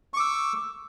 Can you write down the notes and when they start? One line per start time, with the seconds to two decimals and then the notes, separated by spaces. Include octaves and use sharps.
0.14 C#6
0.17 D6
0.20 E6